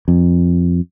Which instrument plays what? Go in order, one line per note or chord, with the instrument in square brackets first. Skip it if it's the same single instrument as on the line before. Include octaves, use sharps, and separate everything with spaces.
[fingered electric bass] F2